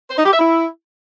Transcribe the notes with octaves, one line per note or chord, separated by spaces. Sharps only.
C5
D#4
G4
E5
E4